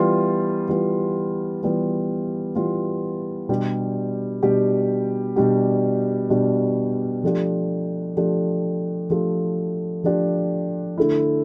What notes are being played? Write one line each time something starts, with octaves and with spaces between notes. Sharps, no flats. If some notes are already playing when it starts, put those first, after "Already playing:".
Already playing: E3 G3 B3 F4
E3 G3 B3 F4
E3 G3 B3 F4
E3 G3 B3 F4
B2 G3 D4 G4
B2 G3 D4 G4
B2 G3 D4 G4
B2 G3 D4 G4
F3 A3 D4 G4
F3 A3 D4 G4
F3 A3 D4 G4
F3 A3 D4 G4
D3 A3 E4